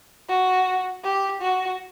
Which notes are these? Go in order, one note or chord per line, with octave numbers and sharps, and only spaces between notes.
F#4
G4
F#4